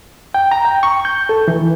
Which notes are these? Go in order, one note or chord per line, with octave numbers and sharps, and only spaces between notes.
G5
A#5
G5
C#6
G6
A4
E3